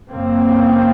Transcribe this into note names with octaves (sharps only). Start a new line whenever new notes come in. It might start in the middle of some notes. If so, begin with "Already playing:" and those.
F#2 C#3 A#3 C4